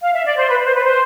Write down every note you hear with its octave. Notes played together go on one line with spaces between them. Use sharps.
F5
E5
D5
C5
B4
C5
B4
C5